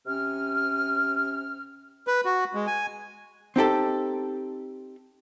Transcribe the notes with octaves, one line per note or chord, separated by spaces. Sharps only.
C3 C#4 F6
B4
F#4
G#3
G#5
C4 D#4 G4 A4